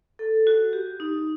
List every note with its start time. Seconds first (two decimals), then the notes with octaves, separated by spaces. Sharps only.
0.19 A4
0.47 F#4
0.73 G4
1.00 D#4